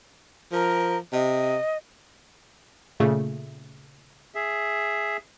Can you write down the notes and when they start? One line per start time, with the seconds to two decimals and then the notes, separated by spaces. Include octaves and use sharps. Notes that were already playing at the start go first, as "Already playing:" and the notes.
0.52 F3 A#4
1.13 C3 D#5
3.00 A#2 C#3 A3
4.35 G#4 E5